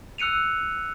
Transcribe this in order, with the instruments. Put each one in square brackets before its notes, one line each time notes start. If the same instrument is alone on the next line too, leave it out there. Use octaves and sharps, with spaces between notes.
[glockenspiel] E6 F#6 C#7 D#7 F7